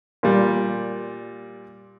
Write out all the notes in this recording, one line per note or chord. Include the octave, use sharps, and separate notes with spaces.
A#2 G3